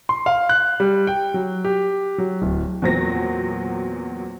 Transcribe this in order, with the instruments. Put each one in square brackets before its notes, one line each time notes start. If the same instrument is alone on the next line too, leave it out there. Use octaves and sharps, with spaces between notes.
[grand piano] C6
F5
F#6
G3
G5
F#3
G4
F#3
D1
[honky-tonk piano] E2 A#2 F#3 C4 A#6